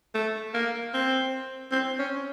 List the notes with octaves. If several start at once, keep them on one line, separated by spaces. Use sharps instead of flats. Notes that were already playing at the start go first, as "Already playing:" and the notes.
A3
A#3
C4
C4
C#4